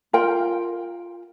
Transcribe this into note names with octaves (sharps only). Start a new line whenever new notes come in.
F4 A#4 G5